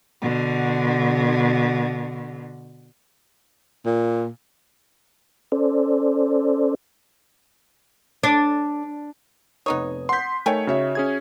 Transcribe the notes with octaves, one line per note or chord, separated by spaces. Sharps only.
B2 D3
A#2
C#4 A4 C5 D5
D4
F1 B3 D#4 C#5 D#6
F#5 C6 G6 B6
D#3 A3 C#5 G5 G#5
C#3 F#4 C#5 E5
C#4 G#4 G#6